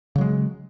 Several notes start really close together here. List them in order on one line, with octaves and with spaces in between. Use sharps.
C#3 F#3 G#3